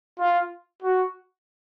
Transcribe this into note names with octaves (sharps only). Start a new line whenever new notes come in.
F4
F#4